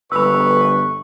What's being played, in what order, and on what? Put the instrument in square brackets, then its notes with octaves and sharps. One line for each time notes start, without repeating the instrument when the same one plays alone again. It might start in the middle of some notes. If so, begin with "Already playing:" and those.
[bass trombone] G1 [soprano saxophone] B4 [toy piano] B5 E6 [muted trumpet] C#6